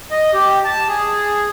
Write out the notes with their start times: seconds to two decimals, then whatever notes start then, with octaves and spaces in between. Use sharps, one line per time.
0.11 D#5
0.34 G4
0.65 A5
0.88 G#4